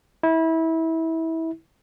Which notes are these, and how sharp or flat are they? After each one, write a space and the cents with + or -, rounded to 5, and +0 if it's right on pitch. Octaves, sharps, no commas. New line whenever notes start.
E4 -25